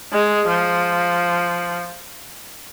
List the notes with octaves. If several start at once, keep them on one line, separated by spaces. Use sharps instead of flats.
G#3
F3